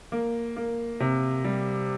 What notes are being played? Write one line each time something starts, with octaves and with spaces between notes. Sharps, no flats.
A#3
A#3
C3
G3